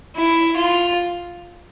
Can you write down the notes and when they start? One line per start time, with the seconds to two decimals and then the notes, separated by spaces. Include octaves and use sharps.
0.16 E4
0.57 F4